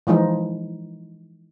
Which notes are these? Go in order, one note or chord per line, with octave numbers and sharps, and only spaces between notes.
E3 F3 G#3 D#4